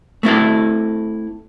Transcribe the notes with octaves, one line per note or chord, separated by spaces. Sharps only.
A3 C4 E4 A4